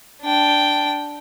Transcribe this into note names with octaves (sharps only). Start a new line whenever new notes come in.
D4 G5